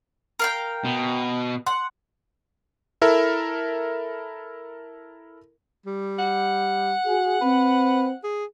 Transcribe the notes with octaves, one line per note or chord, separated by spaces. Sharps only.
A#4 F5 G5
B2
F#5 C6
E4 A4 A#4 E5
G3
F#5
F#4 G#4
C4 B4
G#4